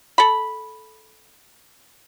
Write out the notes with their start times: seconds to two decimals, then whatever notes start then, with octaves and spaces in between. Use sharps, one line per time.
0.18 A4 B5